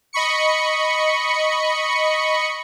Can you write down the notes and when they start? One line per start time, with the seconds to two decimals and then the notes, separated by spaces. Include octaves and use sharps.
0.13 D#5 B5 C#6 C#7